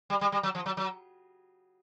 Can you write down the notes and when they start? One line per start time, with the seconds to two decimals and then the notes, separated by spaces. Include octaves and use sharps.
0.10 G3
0.21 G3
0.32 G3
0.43 F#3
0.55 F3
0.66 F#3
0.77 F#3